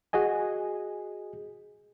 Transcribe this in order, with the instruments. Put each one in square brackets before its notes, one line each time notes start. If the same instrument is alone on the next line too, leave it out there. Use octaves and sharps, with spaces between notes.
[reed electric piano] F#4 G#4 D#5 G#5